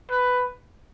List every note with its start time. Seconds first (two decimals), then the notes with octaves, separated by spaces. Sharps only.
0.10 B4